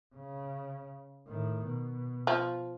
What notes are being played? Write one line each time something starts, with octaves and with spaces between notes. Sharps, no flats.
C#3
A2 D#3
B2
F3